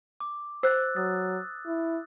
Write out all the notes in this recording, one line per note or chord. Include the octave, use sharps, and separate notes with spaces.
D6
C5 E6 F#6 A6
F#3 D#6 A6
E4